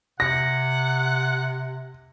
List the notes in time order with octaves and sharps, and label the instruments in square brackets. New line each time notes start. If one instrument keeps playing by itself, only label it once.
[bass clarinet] C3 [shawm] F#5 [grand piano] A#6